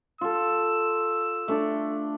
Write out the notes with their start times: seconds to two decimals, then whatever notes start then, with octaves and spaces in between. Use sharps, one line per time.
0.21 F4 A4 E6
1.48 A3 D4 D5